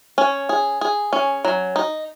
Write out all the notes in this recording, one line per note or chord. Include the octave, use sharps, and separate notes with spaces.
C#4
G#4
G#4
C#4
F#3
D#4